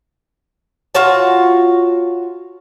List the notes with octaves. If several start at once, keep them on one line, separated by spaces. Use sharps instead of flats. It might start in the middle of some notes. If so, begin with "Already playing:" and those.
F4 F#4 C#5 A5